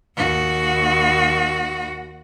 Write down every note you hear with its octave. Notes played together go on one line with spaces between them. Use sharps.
D#2 F#4